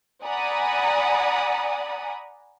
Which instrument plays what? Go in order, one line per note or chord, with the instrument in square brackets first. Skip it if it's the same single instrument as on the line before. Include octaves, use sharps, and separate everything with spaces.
[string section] D5 F#5 G#5 A#5 B5 D#6